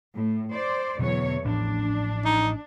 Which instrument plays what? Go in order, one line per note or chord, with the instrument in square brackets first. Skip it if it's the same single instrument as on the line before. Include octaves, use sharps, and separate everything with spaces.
[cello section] A2
C5 D5
[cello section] E2 F#3 C#5 [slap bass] B2 D3 B3
[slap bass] A1 A2 F3 [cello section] D4
[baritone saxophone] D#4